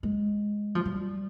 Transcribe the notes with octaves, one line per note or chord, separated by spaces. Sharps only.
G#3
F3
G3